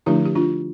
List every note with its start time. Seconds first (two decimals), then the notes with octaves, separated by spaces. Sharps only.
0.06 D3 F3 A3 D4 E4 G4
0.26 G4
0.36 D4 F4